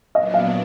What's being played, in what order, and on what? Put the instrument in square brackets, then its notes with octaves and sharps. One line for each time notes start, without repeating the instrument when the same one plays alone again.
[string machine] A#2 F#3 B3 D4 [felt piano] D#5
[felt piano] F5